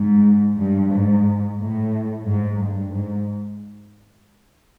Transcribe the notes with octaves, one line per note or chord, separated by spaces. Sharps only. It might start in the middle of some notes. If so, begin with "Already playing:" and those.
Already playing: G#2
G2
G#2
A2
G#2
G2
G#2